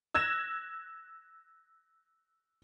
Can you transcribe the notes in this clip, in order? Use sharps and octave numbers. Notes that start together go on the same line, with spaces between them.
E6 F#6 G#6 A#6 E7